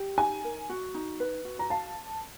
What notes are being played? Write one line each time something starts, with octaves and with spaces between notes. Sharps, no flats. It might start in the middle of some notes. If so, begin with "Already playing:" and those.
Already playing: G4
D#4 G#5
A#4
F#4
D#4
B4
F#4
A#5
F5 A5